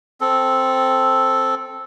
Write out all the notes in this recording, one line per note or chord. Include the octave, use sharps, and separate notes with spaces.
C4 A4